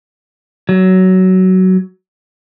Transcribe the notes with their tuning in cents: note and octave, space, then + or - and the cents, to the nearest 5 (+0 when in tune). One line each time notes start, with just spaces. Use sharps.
F#3 +15